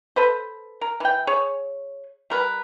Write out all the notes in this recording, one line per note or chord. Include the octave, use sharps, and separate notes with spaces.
A4 B4 C5
A#4
E3 G5
G#4 C#5
G3 A#4 B4